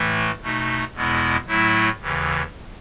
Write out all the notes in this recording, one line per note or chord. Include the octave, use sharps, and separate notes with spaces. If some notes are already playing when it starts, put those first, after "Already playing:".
Already playing: A2 E3 A3
B2 A3 D#4
E2 B2 G#3 B3 E4
A2 F#3 A3 E4
D#2 C#3 E3